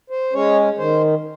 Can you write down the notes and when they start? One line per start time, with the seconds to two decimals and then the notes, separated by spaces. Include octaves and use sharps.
0.10 C5
0.33 G#3 C#4 C#5
0.78 D#3 C5